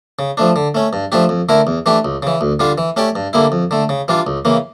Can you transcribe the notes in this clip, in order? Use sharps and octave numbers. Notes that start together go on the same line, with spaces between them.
C#3
F3 A3 D4
D3
A3 C#4
G2
F3 A3 D4 G4
F2
D3 A3 E4 A#4
E2
E3 A3 D4 G4
C#2
C#3 E3
D2
D3 G3 D4 F4
E3
A3 C#4 G4 D5
G2
D3 G3 A#3 E4
F2
D3 A3
C#3
E3 G3 D4 F4
C#2
C#3 E3 A#3